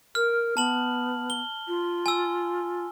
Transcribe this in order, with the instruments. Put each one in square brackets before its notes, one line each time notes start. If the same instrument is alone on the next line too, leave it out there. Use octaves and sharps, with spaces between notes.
[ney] A#4 [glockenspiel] F6
[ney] B3 [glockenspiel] A5 F#7
[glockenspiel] G7
[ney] F4
[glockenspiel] G#5 E6